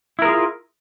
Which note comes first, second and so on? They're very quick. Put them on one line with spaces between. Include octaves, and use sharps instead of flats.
E4 A#4 G#4 F4